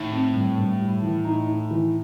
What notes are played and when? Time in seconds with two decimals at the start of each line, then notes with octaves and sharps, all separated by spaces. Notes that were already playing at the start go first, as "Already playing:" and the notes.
Already playing: A2 D#3
0.12 C4
0.34 G2
0.57 G2
0.80 G3
1.02 E3
1.25 D#4
1.47 D#4
1.71 E3